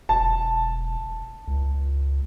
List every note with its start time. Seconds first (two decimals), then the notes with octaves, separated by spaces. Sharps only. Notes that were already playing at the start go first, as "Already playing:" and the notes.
0.09 E1 A5
1.48 C#2